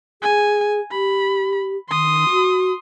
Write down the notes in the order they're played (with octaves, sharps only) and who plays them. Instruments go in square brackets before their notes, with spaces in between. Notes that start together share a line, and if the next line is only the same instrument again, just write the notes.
[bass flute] G#4 [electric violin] G#5
[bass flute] G4 [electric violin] B5
[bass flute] D#3 [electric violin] C6 D#6
[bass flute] F#4